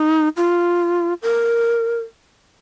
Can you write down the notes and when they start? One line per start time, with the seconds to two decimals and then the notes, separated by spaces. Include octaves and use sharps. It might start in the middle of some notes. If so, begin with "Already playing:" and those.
Already playing: D#4
0.37 F4
1.22 A#4